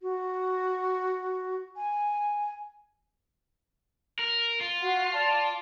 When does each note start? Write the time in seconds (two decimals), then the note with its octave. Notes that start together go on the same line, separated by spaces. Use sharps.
0.02 F#4
1.76 G#5
4.19 A#4
4.61 F4
4.81 F#4 F#5 C6
5.12 D5 A5